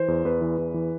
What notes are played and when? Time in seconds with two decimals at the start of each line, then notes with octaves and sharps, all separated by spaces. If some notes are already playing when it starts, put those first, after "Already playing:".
Already playing: E3 C5
0.08 E2
0.25 E2 B4
0.41 E3
0.58 E2
0.74 E3